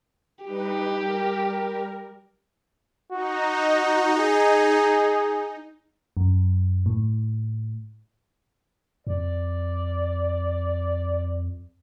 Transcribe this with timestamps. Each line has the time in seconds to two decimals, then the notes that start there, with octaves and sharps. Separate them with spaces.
0.45 G3 D#4 G4 B4
0.96 G3 A#4
3.12 D#4 F#4
4.18 G#4
6.17 F#2
6.86 A2
9.07 F2 D5